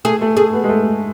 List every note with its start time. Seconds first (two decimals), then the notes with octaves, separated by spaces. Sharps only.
0.05 A3 G#4
0.21 A3
0.37 A3 G#4
0.53 B3
0.64 G#3
0.69 A3